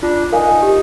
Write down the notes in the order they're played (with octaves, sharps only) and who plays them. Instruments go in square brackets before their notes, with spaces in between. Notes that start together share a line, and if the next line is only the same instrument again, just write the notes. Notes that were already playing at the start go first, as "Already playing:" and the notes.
[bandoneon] D4 [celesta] F4
[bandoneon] D#4 [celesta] A#4 F5 G#5
[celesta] G4